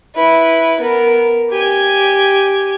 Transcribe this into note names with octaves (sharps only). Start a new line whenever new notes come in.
E4 B4
B3 A#4
G4 G#5